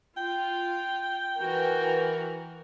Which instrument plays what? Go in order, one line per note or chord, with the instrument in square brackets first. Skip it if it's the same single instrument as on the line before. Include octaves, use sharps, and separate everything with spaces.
[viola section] F4 [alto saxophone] G5
[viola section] E3 F#4 A#4